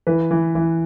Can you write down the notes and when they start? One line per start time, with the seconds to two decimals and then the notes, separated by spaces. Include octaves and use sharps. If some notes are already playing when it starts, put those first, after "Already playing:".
0.07 E3 B4
0.31 E3
0.55 E3